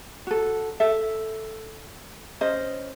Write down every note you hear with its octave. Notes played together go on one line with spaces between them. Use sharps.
F#4 A4
A4 E5
C#4 C5 D#5